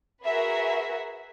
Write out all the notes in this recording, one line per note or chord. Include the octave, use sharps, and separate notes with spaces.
F#4 G#4 A#4 B4 E5